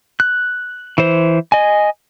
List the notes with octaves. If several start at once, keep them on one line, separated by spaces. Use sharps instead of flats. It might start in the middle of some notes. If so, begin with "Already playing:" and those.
F#6
E3 C5
D#5 G#5